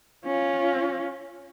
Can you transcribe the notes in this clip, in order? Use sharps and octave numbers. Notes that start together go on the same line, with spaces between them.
C#4 F4